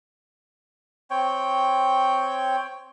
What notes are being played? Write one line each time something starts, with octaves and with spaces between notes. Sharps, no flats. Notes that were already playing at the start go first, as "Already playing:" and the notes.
C4 C#5 G5